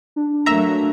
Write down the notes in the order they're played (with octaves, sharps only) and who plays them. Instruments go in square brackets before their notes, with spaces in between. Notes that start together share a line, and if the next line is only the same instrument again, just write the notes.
[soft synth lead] D4
[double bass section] F#3 A3 A#3 [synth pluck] E5 A#5